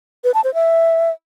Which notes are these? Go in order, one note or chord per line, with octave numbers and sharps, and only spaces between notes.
B4
A5
C5
E5